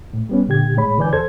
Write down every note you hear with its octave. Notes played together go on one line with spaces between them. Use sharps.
A2
G3 B3 C#4
A#2 D3 G4 G#6
A2 G#3 C#5 B5
D3 E3 B4 D5 G#5 G6
E2 A4 C5 G#6